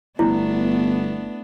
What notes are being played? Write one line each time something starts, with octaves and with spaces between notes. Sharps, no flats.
G1 A3 B3 D4 E4